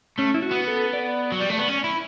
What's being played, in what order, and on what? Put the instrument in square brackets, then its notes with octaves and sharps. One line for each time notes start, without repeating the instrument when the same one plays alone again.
[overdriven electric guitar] A3 [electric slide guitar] C#4
[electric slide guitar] E4
F#4
[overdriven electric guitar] B3
[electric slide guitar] A4
D5
[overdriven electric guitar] F#3
G3
A3
B3
C#4
E4